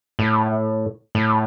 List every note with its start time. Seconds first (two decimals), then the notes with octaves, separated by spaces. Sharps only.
0.19 A2
1.15 A2